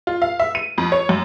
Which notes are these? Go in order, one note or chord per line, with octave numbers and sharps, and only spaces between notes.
F4
F5
E5
D#7
F2
C#5
F#2